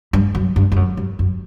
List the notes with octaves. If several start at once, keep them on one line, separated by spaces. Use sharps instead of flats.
G2
F#2
G2
G2
F#2
G2
F#2